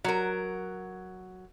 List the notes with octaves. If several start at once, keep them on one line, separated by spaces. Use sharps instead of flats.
F#3 A#4